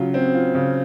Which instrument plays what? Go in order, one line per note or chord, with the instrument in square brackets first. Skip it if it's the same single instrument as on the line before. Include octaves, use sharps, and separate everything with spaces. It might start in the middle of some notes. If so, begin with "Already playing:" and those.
Already playing: [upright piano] C#3 F#3 F4
C4
F4
C#3